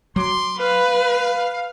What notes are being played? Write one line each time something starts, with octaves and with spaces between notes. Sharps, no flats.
F#3 C6 D6
B4 F5